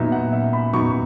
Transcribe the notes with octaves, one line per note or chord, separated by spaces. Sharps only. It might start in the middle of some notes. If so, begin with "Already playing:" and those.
Already playing: A#2 F#3 B3 D#4 E5
F#5
E5
B5
A#2 F#3 B3 D#4 C#6